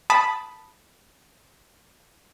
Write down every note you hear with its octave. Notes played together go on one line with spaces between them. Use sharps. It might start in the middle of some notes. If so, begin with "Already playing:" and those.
A5 B5 D#6